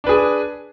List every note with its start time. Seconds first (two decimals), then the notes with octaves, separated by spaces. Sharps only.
0.04 D4
0.06 B4
0.09 G#4